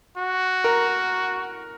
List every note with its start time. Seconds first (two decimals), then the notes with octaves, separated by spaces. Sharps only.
0.17 F#4
0.64 A#4